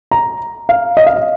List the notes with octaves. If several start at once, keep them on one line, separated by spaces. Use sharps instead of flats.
A#5
F5
D#5
F5
D#5